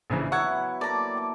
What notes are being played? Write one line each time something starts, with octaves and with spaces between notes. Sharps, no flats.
A#1 C#3 E3 D#5 E5 A#5
F#3 B3 E4 F#5 C#6 E6 G#6
A#3 A4 D5 A#5
G5 D6